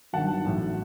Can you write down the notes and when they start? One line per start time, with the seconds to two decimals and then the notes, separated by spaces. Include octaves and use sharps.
0.13 G1 F#2 D#3 F#3 F#5 A5
0.45 A1 A2 F#3